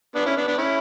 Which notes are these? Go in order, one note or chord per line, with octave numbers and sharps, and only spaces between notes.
B3 D4
C#4 E4
B3 D4
B3 D4
C#4 E4